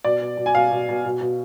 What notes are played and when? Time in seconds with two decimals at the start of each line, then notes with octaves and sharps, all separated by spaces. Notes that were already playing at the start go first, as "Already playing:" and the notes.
0.04 B2 D5
0.21 B2
0.37 B2
0.46 G#5
0.54 B2 F5
0.71 B2
0.89 B2
1.05 B2
1.21 B2